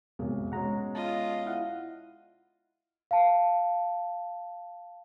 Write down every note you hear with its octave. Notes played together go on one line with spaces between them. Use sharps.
B1 F2 G#2 C3 A#3 G#4
B2 G#3 C#4 F#5 A#5
F4 D#5 A5
E4 F5 F#5
F5 A5